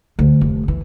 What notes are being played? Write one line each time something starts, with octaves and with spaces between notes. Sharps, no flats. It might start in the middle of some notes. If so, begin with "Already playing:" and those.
D2
F1
E3